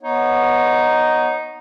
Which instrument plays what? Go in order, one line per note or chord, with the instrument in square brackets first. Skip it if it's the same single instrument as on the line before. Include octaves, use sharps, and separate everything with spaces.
[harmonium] B3 C#5 [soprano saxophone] D#4